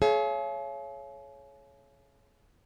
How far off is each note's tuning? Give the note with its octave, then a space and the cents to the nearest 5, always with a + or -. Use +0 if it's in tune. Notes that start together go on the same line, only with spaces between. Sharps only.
G#4 +40 C#5 +0 F5 -45